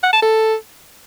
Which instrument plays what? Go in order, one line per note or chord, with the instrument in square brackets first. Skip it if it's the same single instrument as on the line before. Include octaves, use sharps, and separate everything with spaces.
[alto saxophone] F#5
A5
A4